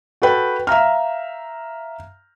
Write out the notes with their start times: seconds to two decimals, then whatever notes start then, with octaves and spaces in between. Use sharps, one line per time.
0.22 F#4 A4 B4 G5
0.67 E5 F5 A#5 F6